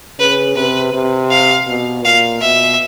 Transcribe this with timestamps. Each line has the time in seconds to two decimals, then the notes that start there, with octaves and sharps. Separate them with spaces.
0.18 C#3 B4
0.55 C3 B4
0.93 C3
1.30 F5
1.67 B2
2.04 A#2 F5
2.41 B2 E5